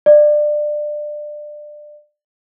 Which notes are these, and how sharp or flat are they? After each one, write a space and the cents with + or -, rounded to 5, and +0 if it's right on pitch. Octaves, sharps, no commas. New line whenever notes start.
D5 +20